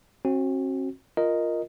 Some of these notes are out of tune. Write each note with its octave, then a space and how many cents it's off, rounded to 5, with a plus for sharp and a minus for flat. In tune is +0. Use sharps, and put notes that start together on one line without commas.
C4 +45 F#4 +0
F4 +0 A#4 +0 D#5 +0